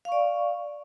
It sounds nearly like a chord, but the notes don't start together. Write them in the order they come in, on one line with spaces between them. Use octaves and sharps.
F5 C#6 D5